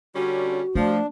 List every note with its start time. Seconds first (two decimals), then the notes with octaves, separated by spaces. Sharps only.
0.16 D3 G3 C#4 F#4
0.75 F3 A3 D4